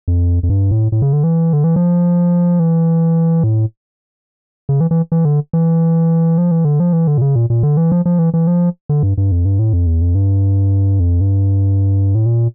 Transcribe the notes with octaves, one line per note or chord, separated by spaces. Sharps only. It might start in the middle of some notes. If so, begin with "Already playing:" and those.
F2
F2
G2
A2
A2
C#3
D3
E3
D3
E3
F3
E3
A2
C#3
E3
E3
E3
D3
E3
F3
E3
D3
F3
E3
D3
A#2
C#3
A#2
A#2
D3
E3
F3
F3
E3
E3
F3
D3
G2
G2
F2
G2
A2
F2
E2
F2
G2
F2
G2
A2
A#2